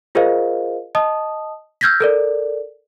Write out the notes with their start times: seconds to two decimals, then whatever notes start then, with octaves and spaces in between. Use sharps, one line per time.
0.15 F4 G#4 A#4 C5 D#5 F5
0.95 D#5 A5 D#6
1.81 E6 F6 G6 G#6 A#6 B6
2.00 A4 A#4 D5